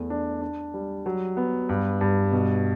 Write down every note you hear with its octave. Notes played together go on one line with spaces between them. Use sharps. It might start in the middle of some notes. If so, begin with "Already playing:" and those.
Already playing: E2 A3
D4
D4
G3
F#3
B3
G2
G2
B2